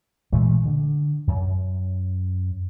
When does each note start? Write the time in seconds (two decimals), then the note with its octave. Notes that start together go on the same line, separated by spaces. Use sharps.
0.32 A#2 E3 G#3 A3
0.65 D3
1.27 F#2